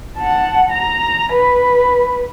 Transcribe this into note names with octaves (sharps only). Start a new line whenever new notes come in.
F#5 A5
A#5
B4